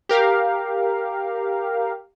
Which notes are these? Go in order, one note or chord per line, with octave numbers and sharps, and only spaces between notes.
G4 A#4 F5